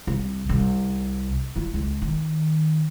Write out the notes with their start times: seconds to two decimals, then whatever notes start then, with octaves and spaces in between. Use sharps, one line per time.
0.07 C2
0.49 C2
1.56 E4 F4
1.74 C#2
2.02 D#3